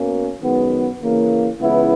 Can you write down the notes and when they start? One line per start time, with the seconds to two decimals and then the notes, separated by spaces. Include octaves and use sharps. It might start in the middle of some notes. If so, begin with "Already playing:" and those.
Already playing: B2 A#3 C#4
0.42 F#2 D#3 G#3 B3
1.01 C#3 E3 A#3
1.60 C#2 C#3 E3 B3 E4